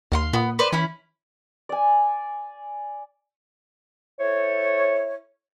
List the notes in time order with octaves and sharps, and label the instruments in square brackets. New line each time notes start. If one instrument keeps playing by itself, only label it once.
[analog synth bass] D#2 [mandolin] F5 F#5 C6
[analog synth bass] A#2 [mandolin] B3
[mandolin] B4 C5 D5
[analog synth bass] E3 [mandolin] C#4 E4
[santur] D5 G#5
[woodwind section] E4 A4 C5 C#5